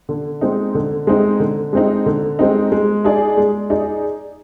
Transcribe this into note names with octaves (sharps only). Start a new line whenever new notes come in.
D3
G#3 C4 D#4
D3
G#3 C4 D#4
D3
G#3 C4 D#4
D3
G#3 C4 D#4
G#3
D#4 G#4 D5
G#3
D#4 G#4 D5